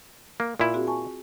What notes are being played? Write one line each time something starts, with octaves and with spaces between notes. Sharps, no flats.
A#3
A#2 E4 F4
C4 F#4 G#4
G#5 A5 C#6